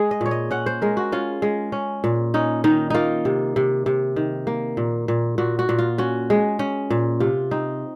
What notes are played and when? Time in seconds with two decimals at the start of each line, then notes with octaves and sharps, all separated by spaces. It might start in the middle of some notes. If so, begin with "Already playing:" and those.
Already playing: G#3 G#4
0.11 D#5
0.21 A#2 C#5
0.31 D#5
0.51 C#4 F#5
0.66 C5
0.82 G#3 A#4
0.97 F#4
1.12 C#4 F4
1.42 G#3
1.72 C#4
2.04 A#2
2.34 C#4 D#4
2.64 D#3 D#4
2.90 A#3 D#4 F4
3.25 C3
3.56 C3
3.86 C3
4.16 D#3
4.47 A#3
4.77 A#2
5.08 A#2
5.38 A#2 F#4
5.59 F#4
5.69 A#2
5.79 F4
5.98 C#4 F#4
6.30 G#3
6.59 C#4
6.90 A#2
7.20 C3 F4
7.51 C4 D#4